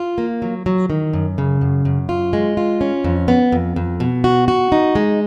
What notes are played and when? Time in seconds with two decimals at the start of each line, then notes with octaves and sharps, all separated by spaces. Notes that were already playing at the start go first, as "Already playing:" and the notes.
Already playing: F4
0.18 A#3
0.42 F#3
0.66 F#3
0.90 D#3
1.13 F#2
1.38 C#3
1.61 F#2
1.85 F#2
2.09 F4
2.33 G#3
2.57 F4
2.81 C#4
3.04 F2
3.28 B3
3.52 F2
3.76 F2
4.00 B2
4.24 F#4
4.48 F#4
4.72 D#4
4.95 G#3